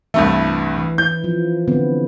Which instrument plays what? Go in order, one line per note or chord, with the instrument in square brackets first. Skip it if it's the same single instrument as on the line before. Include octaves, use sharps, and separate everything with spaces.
[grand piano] C2 G2 A3 [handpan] E3 D4
[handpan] E3
[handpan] E3 E4 [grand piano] G6
[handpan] F3 E4
D3 B3 C4